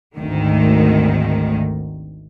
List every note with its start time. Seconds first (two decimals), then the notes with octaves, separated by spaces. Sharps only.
0.15 G#1 D2 D#3